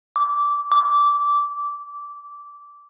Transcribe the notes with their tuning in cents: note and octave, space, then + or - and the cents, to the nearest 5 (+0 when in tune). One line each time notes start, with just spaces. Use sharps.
D6 -15
D6 -15